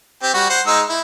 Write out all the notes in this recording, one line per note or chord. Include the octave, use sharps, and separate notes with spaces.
C4 G4
G3 F#4
C5 F#5
G#3 D#4 E6
E4